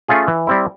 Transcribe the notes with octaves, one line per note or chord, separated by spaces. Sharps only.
A3 C#4 F4 G#4
E3
G3 C4 E4